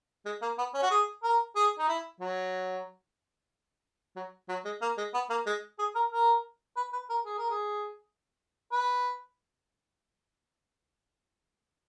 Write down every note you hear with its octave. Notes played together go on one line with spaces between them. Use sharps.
G#3
A#3
B3
C#4
F#4
G#4
A#4
G#4
D#4
E4
F#3
F#3
F#3
G#3
A#3
G#3
B3
A#3
G#3
G#4
A#4
A#4
B4
B4
A#4
G#4
A#4
G#4
B4